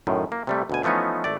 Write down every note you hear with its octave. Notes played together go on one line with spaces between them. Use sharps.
F#2 A2 D#3
A#3
C3 G3 A3
D2 B2 G#5
E3 F3 A3 B3 C#4 D#4
G#1 A3 D5